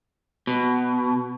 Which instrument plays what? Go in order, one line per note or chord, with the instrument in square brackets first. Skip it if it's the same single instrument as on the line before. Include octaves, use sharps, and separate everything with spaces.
[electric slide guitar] B2